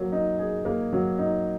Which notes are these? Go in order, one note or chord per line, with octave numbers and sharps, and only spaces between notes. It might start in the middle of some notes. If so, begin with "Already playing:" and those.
Already playing: F#3 A#3
D#4
G#4
A#3
F#3
D#4